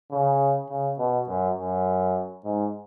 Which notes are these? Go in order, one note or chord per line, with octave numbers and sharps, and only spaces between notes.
C#3
C#3
B2
F#2
F#2
G#2